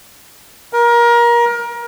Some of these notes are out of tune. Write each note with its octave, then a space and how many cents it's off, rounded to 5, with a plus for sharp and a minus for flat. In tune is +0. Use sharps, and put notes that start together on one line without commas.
A#4 +25